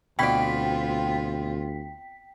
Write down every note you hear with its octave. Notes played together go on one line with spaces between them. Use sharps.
D2 B2 B3 C4 F4 D5 G5 B6